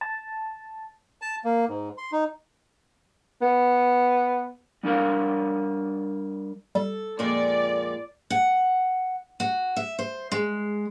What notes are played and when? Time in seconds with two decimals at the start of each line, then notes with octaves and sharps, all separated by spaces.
0.01 A5
1.22 A5
1.44 A#3
1.69 G#2
1.98 C6
2.12 D#4
3.42 B3
4.83 G3 D4 A#4 F5
6.75 G3 A4
7.19 F2 A#2 G#3 D5
8.30 F#5
9.40 F#4
9.76 E5
9.99 C5
10.32 G#3